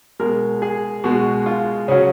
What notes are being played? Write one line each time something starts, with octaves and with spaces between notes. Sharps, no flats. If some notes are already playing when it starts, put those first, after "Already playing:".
B2 G#3 A#4
G#4
B2 G#3 F#4
F4
C#3 F#3 C#4